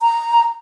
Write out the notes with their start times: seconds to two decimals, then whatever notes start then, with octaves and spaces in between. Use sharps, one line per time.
0.01 A#5